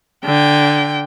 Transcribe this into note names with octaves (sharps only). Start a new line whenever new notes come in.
D3 G5